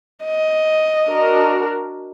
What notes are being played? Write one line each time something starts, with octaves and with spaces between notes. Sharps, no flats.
D#5
D4 F#4 A#4